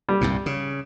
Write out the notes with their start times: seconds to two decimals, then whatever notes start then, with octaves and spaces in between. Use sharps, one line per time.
0.09 G3
0.21 C2 G2 A#2
0.46 C#3